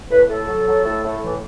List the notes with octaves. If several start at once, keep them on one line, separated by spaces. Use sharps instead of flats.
A2 B4
A2 A4
F#3
F#3
A2
A2
E3